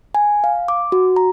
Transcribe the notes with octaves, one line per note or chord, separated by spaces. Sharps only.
G#5
F5
D6
F#4
A#5